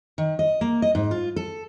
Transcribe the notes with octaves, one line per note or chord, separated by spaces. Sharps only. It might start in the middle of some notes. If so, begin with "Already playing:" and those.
D#3
D#5
A#3
D#5
G#2
F4
A4